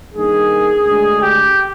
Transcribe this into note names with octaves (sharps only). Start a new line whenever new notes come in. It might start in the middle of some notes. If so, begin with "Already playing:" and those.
G2 D#3 A#3 G#4
D2 D3 G#3
G4